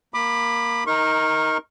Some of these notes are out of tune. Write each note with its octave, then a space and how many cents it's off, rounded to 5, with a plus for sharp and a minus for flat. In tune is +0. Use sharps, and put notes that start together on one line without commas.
A#3 +0 B5 +0 D6 +35
D#4 +20 A#4 +0 C#6 -35